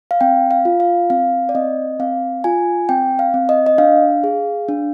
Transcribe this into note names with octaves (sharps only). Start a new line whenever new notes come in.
F5
C4 G5
F5
F4
F5
C4 F5
D5
C4 D#5
C4 F5
F4 G#5
C4 G5
F5
C4
D#5
D#5
D4 F5
G#4
D4